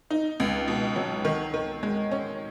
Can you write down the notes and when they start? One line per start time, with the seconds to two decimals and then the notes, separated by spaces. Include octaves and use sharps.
0.11 D#4
0.40 C#2
0.68 B2
0.96 F#3
1.25 D#3
1.54 D#3
1.83 G#3
2.11 C#4